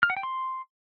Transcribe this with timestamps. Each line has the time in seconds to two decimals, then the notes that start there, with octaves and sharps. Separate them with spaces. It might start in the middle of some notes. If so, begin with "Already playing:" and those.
0.03 F6
0.10 F#5
0.17 G5
0.23 C6